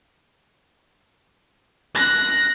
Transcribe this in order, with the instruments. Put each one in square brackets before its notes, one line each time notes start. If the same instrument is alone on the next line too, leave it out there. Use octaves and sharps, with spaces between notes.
[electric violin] F#6 A#6